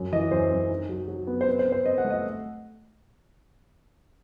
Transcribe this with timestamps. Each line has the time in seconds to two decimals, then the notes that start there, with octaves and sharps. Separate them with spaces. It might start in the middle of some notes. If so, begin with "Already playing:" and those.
Already playing: F#2 F#3
0.12 E3 D#5
0.31 F#2 C5
0.50 F#2
0.69 D#4
0.89 F#3
1.08 F#3
1.27 B3
1.41 C5
1.46 C4 B4
1.59 C5
1.66 C4
1.72 C5
1.86 C4 D#5
1.98 F#5
2.04 A3
2.11 D#5